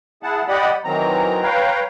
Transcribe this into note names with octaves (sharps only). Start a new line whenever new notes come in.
E4 G#4 F#5 A5
G4 D5 D#5 F#5 B5
D#3 E3 F#3 C4 A#5
B4 C#5 F5 G5 A#5